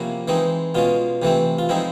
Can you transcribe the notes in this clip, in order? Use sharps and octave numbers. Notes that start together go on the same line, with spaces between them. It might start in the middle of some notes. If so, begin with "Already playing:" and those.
Already playing: C3 F3 A#3 C#4 E4 F#4
E3 G#3 C4 D#4
B2 G#3 C#4 F4
C3 E3 A3 C4
F4
F3 G#3 C4 D#4 E4